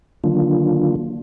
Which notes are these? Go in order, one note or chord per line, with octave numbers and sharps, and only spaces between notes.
D3 D#3 F#3 A#3 D4 F4